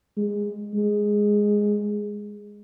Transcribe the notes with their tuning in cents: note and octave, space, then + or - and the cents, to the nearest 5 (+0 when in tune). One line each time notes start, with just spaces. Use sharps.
G#3 -15
G#3 -5